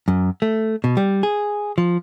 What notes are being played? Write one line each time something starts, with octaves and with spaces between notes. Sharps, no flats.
F#2
A3
B2
G3
G#4
F3